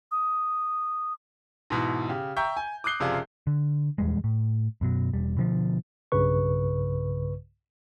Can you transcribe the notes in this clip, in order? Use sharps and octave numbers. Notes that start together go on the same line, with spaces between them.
D#6
G#2 B2 E3 E4
C#3 G4
E5 G5 A#5 C#6 G6
G#5
D6 D#6 F#6 C7 G7
F#1 C3 F3 G#4 D5 F5
D3
D#1 E2 G3 G#3
A2
F#2 B2 F#3
E1 G3
B2 D3 E3 F3
B1 G2 C#3 B4 C#6